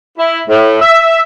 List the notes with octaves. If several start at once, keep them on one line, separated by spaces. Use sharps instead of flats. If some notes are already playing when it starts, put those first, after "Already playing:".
E4
A2
E5